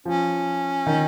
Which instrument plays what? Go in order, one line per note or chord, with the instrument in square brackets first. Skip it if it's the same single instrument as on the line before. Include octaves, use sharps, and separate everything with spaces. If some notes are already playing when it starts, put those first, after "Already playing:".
[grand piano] F3 [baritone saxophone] C#4
[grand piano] D#3